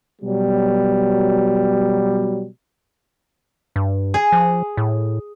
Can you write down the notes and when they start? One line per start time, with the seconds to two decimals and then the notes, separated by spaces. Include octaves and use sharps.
0.22 B2 F#3 G3
3.76 G2
4.14 G#4
4.32 F3
4.77 A2